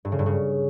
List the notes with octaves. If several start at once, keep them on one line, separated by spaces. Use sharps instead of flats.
G2
C#3
G2
C#3